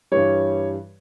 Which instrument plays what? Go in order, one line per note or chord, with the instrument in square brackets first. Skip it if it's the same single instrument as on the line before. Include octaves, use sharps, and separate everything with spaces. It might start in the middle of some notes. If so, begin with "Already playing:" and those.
[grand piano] G2 E3 G3 C#5